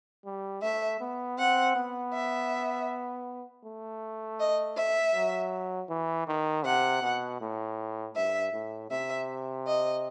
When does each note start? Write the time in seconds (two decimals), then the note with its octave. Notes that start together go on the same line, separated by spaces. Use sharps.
0.25 G3
0.62 A3 E5
1.01 B3
1.38 C4 F#5
1.76 B3
2.13 E5
3.64 A3
4.40 D#5
4.77 E5
5.15 F#3
5.89 E3
6.28 D#3
6.65 C3 F#5
7.02 B2
7.41 A2
8.16 G2 E5
8.53 A2
8.91 C3 E5
9.67 D#5